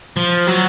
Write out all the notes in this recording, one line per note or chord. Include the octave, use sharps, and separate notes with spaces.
F3
F#3